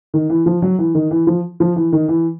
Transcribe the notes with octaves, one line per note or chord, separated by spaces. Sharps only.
D#3
E3
F3
F#3
E3
D#3
E3
F3
F3
E3
D#3
E3